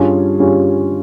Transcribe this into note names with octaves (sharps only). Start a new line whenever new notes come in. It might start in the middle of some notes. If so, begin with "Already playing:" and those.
Already playing: G2 G3 C#4 F4 G#4
G2 G3 C#4 F4 G#4